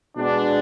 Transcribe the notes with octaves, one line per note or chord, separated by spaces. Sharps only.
B2 G#3 B3 D4